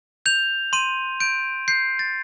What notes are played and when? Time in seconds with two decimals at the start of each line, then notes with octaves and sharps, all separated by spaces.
0.26 G6 F7
0.73 C6 D#7
1.20 G6 D7
1.68 G6 C7
1.99 A6